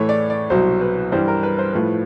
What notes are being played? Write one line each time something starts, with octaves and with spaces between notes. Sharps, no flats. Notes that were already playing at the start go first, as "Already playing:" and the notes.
Already playing: A2 E3 A3 C#5
D5
D5
C2 B2 F#3 C5
B4
G2 E3 G3 C5
A#4
B4
C5
A2 F3 A3 B4